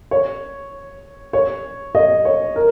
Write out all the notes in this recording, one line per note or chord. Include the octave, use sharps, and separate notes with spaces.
C#5
C#5
D#5
C#5
A#4